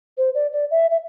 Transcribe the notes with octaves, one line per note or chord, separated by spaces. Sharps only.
C5
D5
D5
E5
E5